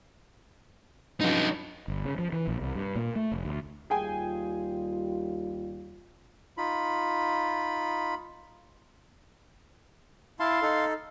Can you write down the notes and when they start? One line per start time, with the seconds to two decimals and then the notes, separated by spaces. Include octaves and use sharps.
1.21 G2 C#3 F3 F#3 D#4
1.88 G1
2.05 C#3
2.19 F3
2.33 E3
2.47 A#1
2.61 C2
2.75 G2
2.95 A#2
3.16 A3
3.31 F1
3.45 D2
3.90 D#2 G3 F4 G#4 G5 G#5
6.57 D#4 F4 B5
10.40 E4 F5 A5 C6
10.62 D#4 A4